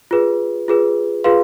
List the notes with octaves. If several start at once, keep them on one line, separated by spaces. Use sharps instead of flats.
F4 G#4 B4
F4 G#4 B4
F4 G#4 B4 F5 C6